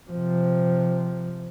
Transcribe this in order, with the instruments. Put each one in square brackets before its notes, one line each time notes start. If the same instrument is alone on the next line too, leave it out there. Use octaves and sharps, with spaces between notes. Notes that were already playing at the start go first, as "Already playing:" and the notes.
[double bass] C3 F3